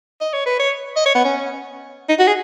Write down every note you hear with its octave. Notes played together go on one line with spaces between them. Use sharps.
D#5
C#5
B4
C#5
D#5
C#5
B3
C#4
D#4
F#4
G#4